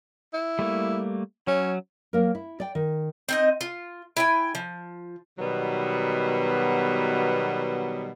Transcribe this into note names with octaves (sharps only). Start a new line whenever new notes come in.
E4
G3 A3 A#3
F#3 C#4
F#3 A#3 A#4
E4
D5 G5
D#3
C4 D#4 D#5
F4
E4 G5 G#5
F3
B2 D#3 F#3 G3 B3